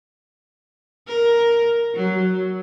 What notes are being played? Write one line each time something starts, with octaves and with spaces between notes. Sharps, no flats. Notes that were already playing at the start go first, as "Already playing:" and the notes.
A#4
F#3